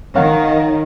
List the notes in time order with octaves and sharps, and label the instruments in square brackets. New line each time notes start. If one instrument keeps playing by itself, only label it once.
[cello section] D#3 [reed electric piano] C#5 F5 F#5